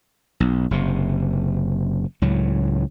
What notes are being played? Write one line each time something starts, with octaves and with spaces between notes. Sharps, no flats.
B1
F#1 C3
C#2 A2 F#3